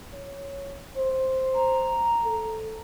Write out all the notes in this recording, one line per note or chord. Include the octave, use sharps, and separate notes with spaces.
C#5
C5
A#5
A4